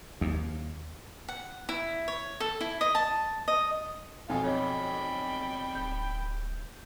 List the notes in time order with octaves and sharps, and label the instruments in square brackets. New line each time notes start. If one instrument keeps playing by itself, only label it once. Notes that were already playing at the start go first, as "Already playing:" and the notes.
[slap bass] D#2
[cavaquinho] F#5
E4
C#5
A4
E4
D#5
A5
D#5
[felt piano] B1 F2 G#5 [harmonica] F4 A4 F5
[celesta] C#5 D#5 [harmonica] G5 B5
[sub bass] D1 [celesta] G6